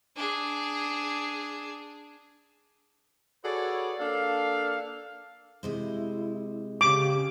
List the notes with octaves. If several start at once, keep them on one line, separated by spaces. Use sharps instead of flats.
D4 G#4
F#4 G#4 A4 B4 C#5 D5
A#3 D4 A4 F5
C3 G#3 E4 C5
C#3 G4 D6